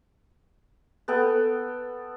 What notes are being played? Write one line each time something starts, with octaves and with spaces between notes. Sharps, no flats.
B3 A4 G5